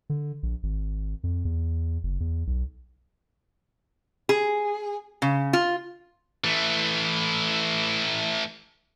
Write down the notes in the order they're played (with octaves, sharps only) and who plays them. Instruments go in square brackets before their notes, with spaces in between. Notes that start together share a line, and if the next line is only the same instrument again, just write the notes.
[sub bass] D3
A#1
G#1
F2
E2
F#1
E2
B1
[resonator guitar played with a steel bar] G#4
C#3
F4
[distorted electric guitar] E3 A3